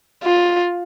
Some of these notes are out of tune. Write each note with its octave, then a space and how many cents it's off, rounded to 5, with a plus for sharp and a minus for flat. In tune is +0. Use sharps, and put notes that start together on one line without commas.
F4 +10